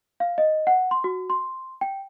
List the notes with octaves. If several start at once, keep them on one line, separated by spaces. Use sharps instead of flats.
F5
D#5
F#5
C6
F#4
C6
G5